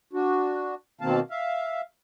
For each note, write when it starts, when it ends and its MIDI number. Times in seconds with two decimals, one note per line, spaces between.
0.13 0.74 62
0.13 0.74 66
1.01 1.20 47
1.01 1.20 51
1.01 1.20 58
1.01 1.20 60
1.01 1.20 77
1.01 1.20 81
1.31 1.81 76
1.31 1.81 77